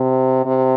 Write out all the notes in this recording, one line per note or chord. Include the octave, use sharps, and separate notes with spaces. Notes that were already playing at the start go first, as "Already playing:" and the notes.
Already playing: C3
C3